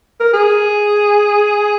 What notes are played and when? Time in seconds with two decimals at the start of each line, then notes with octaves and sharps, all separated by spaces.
0.20 A#4
0.33 G#4